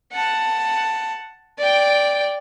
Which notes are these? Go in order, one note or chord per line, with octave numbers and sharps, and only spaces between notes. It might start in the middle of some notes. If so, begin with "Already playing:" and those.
F#5 A5
D5 G5